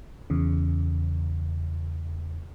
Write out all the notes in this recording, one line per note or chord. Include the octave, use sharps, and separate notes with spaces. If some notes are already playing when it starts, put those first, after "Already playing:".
E2 C#3